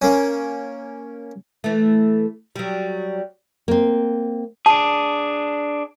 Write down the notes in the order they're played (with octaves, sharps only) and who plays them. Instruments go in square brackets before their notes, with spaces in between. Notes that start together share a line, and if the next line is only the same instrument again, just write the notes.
[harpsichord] A#3 C#4
[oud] E3 A3
F#3 G3
[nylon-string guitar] A#3 C4
[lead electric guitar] D4 G#4 [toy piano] A5